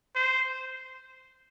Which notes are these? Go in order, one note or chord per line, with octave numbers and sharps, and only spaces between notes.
C5